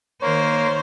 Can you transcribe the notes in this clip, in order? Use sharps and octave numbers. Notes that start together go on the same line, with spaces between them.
D#3 A#3 C5 C#5